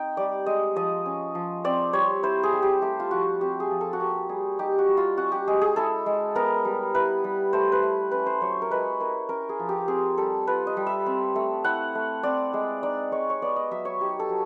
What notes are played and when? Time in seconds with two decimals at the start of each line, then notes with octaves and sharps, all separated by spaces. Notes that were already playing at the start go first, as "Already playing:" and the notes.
Already playing: C4 D#4 G5
0.17 G3 D5
0.46 G#3 D#5
0.76 F3 D#5
1.06 C#4
1.35 F3
1.64 C4 D5
1.93 G3 C#5
2.23 E4 C5
2.43 G#4
2.53 G3
2.62 G4
2.82 A3 G4
3.00 F4
3.11 F3 F#4
3.41 C4 G4
3.60 G#4
3.71 F3
3.81 A4
3.93 F#4
4.00 A#3 G4
4.29 G3 G#4
4.59 D#4 G4
4.79 F#4
4.88 G3
4.97 F4
5.17 C#4 F#4
5.32 G4
5.47 G#3 G#4
5.61 G#4
5.76 E4 A4
6.06 G#3
6.35 B3 A#4
6.65 G3
6.94 E4 B4
7.24 G3
7.53 A3 C5
7.72 B4
7.83 E4
8.11 C#4 B4
8.26 C5
8.41 F#3 C#5
8.62 A#4
8.71 G#3 B4
9.00 E4 A#4
9.29 C#4 A#4
9.49 G#4
9.59 F3
9.69 G4
9.88 C4 G#4
10.17 G3 A4
10.47 F4 B4
10.67 D#5
10.77 G3
10.87 E5
11.06 C4
11.36 A3
11.64 E4 F#5
11.95 A3
12.23 C4 D5
12.54 G#3
12.83 D#4 D5
13.12 G#3 C#5
13.30 C#5
13.42 B3 D5
13.56 D#5
13.71 F#3 E5
13.85 C#5
14.01 D#4 G4
14.19 A4
14.29 F#3